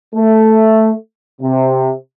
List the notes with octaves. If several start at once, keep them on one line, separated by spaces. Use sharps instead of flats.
A3
C3